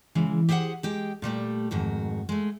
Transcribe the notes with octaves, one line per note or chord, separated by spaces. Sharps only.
C#3 E3 G#3
G4 G#4 C5 E5 F#5
G#3 G4 G5
A#2 G3 A3 G4
F2 G#2 D#3 F#4
G#3 A3